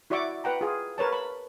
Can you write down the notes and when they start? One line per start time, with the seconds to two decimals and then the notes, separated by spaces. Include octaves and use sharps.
0.10 E4 F#4 D5 E5 C#6 D6
0.44 B4 F#5 G5 A#5
0.61 F4 G#4
0.98 A#4 B4 C#5 A5
1.13 B5